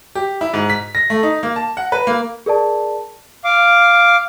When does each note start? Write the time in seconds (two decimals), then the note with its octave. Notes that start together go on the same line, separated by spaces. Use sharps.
0.15 G4
0.41 E4
0.54 G#2
0.70 B6
0.95 A#6
1.10 A3
1.23 D#4
1.43 A#3
1.56 A5
1.77 F#5
1.92 B4
2.07 A#3
2.46 G#4 A#4 D5 A5
3.44 F5 D6